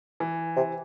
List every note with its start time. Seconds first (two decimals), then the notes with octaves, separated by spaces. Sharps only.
0.20 E3
0.56 C3